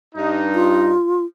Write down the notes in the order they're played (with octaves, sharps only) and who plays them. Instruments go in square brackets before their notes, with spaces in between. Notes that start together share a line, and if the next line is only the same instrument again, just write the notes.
[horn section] G2 D#4
[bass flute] F4